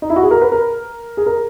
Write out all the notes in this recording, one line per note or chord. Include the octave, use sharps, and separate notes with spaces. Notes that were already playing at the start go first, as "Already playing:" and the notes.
D#4
E4
F#4
G#4
A#4
B4
A#4
G#4
A#4